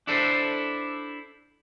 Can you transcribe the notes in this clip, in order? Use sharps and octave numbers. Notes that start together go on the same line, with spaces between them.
D4 E4 A4 C5